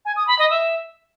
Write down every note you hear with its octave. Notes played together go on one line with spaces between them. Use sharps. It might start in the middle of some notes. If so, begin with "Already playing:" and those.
G#5
D#6
B5
D#5
E5